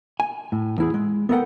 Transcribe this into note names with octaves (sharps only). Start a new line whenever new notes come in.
G#5
A2
E2 E4 G#4
G#3
B3 A4 A#4 D#5 F#5 G5